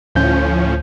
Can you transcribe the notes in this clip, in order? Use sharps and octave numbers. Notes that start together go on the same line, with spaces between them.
D2 A2 F3 C#4 G6